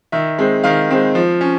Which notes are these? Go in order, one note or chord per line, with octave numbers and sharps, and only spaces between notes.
D#3 E5
G#3 C4
D#3 F5
G#3 C4
F3
C#4